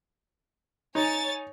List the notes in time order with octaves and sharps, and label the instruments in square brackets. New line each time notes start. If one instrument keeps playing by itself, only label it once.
[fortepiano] D#4 [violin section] C#5 G#5 A6